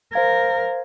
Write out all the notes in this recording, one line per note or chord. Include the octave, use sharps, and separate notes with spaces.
A#4 C5 F5 G#6